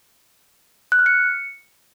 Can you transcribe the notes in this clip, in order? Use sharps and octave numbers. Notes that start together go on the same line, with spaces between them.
F#6
F6
C#7